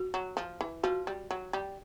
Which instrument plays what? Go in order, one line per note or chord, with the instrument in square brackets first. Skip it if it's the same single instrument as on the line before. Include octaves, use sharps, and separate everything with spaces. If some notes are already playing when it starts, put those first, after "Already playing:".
Already playing: [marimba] F#4
[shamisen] F#3
F3
E3
[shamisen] F3 [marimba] F#4
[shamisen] G3
F#3
G3